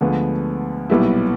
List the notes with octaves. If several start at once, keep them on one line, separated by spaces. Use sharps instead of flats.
D2 D3 F3 G#3 B3
B1 A#2 G3 B3 E4